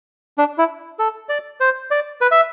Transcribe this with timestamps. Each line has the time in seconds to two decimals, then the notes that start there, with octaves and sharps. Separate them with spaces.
0.38 D4
0.58 E4
0.99 A4
1.29 D5
1.60 C5
1.91 D5
2.21 B4
2.31 E5